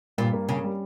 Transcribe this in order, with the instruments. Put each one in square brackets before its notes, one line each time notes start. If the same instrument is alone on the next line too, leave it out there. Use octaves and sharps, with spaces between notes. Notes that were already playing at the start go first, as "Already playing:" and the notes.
[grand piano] G2 [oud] A#2
[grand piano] A#3
[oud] C#3 [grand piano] C#4
[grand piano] G3